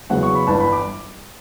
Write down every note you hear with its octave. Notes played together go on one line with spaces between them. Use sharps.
E2 C#3 F#3 F#5
C#6
B5
G1 G2 E3 A5
B5
D6